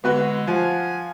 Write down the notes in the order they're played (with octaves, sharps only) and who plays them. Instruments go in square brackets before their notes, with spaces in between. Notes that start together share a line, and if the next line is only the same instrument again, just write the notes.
[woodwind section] D3 G#3 [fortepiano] B3 F#4 B4
[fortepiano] F3 [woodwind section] F5 F#5 G#5